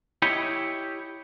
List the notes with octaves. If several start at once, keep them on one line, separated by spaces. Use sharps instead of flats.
E4 G4 C#5 D#5